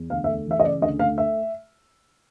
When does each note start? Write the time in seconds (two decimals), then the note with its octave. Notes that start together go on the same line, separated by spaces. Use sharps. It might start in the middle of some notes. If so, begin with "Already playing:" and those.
Already playing: E2
0.10 D2 F5
0.24 E5
0.28 A3
0.46 E3 E5
0.60 D#5
0.64 C#3 D5
0.81 D2 D#5
0.99 A3 F5
1.18 E5